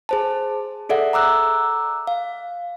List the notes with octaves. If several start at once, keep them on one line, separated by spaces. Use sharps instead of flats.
G#4 C5 A5
G#4 A4 D5 E5 F#5
A#5 D6 E6 F#6
F5